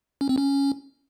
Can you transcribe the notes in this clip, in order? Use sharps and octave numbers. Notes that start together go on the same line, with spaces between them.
C#4
C4
C#4